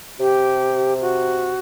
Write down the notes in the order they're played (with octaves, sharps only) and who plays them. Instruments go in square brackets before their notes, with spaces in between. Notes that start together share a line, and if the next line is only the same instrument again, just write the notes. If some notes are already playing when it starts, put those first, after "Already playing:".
[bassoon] C3 [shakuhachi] G4
[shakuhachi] F#4